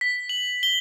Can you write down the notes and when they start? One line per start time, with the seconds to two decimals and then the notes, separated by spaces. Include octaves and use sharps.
0.01 B6
0.29 F#7
0.63 G7